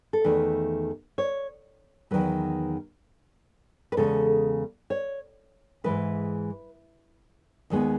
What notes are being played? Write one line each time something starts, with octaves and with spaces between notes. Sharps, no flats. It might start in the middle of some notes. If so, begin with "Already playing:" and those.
A4
E2 D#3 A3 B4
C#5
E2 D#3 F#3 A3 B4
B4
E2 C#3 G#3 A4
C#5
G#2 E3 G#3 B4
D#2 D#3 G#3 B3